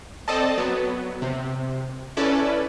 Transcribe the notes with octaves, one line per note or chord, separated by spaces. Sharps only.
C4 A4 D5 D#5 A5
F#3 B3
C3
C#4 E4 A4 B4 D5